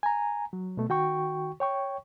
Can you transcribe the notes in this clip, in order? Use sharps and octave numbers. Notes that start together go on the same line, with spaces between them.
G#5 A#5
F#3
B2 A3
D#3 F#4 G5 C#6
C#5 G5 C#6